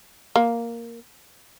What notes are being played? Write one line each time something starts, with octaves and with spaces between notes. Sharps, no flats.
A#3